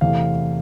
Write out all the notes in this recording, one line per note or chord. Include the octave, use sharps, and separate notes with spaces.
E2 C3 E3 A3 F5